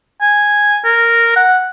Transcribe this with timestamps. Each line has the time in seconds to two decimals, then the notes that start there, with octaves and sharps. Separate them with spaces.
0.22 G#5
0.85 A#4
1.36 F#5